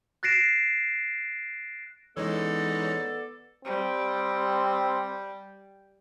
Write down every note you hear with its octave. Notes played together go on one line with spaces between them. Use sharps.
F#6 A6 A#6 C7 D7 E7
E3 G#3 B3 C#4 D#4 A4 D5
G3 C4